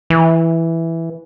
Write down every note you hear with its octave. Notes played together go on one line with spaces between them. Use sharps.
E3